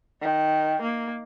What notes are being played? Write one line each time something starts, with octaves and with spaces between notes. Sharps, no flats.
D#3
A#3